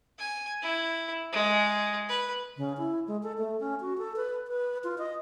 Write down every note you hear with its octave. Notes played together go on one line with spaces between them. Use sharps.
G#5
E4
G#3
B4
C#3
E4
G#3
A4
A3
C#4
F#4
A4
B4
B4
F4
D#5